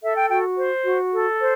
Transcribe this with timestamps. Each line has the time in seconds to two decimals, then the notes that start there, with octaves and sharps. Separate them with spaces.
0.03 A4 E5
0.17 G5
0.30 F#4 G5
0.58 C5
0.85 F#4
1.12 A4
1.40 C5